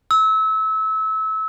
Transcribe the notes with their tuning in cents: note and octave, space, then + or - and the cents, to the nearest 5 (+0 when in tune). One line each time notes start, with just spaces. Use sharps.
E6 -25